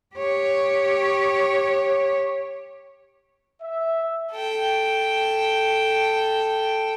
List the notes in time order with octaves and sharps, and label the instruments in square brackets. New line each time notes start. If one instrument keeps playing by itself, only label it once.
[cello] G4 C#5
[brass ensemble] E5
[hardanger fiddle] A4 G5